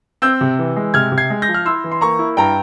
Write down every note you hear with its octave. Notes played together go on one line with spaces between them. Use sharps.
C4 E6 G6
C3
E3
G#3
C3 F6 G#6
C3
G#6 C7
G#3
G6 A#6
F3
F6
E4 C6 E6
E3
C6
A#3 A#5 C#6
E4
G2 G5 A#5